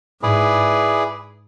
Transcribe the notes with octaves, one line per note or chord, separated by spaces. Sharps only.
G#2 E4 G#4 B4 D5